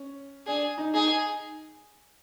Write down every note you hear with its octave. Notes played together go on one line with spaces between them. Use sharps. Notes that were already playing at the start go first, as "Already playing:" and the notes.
Already playing: C#4
D4 G#4
D#4
D#4 G#4